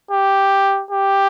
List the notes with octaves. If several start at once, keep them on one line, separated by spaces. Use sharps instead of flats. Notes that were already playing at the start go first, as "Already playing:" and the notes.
G4
G4